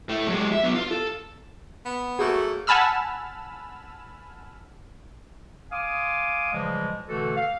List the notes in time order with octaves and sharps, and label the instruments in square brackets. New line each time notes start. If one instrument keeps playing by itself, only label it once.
[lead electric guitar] A2 A3
F#3 G#3
E5
F#3 B3
F4
A4
[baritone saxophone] B3
[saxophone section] F#3 A3 A#3 [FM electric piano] F#4 [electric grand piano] G#4
[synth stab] F#5 G#5 A5 B5 E6 F6
[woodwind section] F5 G#5 C6 D6 D#6
A#2 C#3 E3 F3 G3 G#3
B2 D3 E3 A3 F#4 A4
F5